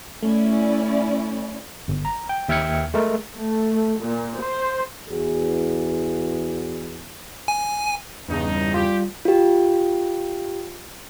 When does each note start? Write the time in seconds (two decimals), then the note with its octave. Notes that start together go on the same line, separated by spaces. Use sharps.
0.23 A3 C#4 E4 D5
1.88 G1
2.05 A#5
2.29 G5
2.49 D#2 E5 G5 F6 G#6 C#7
2.94 G#3 A3 A#4
3.35 A3
4.00 A#2
4.40 C5
5.08 E2 F#4 G#4
7.48 G#5
8.28 E2 G2 C#3 D#4
8.74 G3 F4 G4
9.25 F4 G4